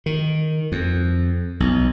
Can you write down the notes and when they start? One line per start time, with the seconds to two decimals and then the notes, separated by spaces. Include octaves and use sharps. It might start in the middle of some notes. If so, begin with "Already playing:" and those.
0.06 D#3
0.72 F2
1.60 B1